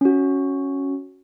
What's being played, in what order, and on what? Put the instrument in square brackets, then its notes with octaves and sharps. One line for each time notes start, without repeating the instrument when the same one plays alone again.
[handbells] C#4 F#4